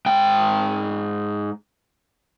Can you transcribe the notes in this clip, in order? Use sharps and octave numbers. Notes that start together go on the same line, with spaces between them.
G#2 G5